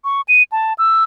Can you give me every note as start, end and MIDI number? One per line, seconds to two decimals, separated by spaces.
0.04 0.21 85
0.28 0.43 99
0.52 0.73 81
0.78 1.04 88